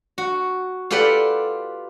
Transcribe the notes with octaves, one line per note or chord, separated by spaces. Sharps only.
F#4
F4 G4 A4 B4 D5 F#5